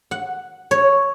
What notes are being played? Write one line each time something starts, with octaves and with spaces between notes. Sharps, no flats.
F#5
C#5